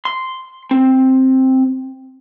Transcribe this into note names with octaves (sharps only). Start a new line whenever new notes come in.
C6
C4